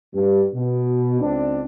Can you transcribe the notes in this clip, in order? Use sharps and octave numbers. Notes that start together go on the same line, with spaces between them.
G2
B2
C#2 C4 D4